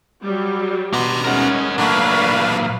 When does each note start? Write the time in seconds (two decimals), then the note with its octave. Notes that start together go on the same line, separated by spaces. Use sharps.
0.22 F#3 G3
0.93 B2 B3 D4 A#5 C6
1.24 G#3 C#4 D#4 A#4 F#5
1.78 A#2 F#3 A3 A#3 D4 B4 F5 B5